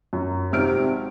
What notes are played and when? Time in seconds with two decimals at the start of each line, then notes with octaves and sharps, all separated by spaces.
0.13 F#2
0.52 G#1 C3 F6 D7